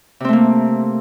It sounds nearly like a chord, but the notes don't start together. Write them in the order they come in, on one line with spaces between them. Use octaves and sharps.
C3 C4 A3 A#3